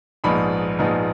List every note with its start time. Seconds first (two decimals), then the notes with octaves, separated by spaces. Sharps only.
0.24 A#1 G#2 F3 B3 D#4 B5
0.79 A#1 G#2 F3 B3 D#4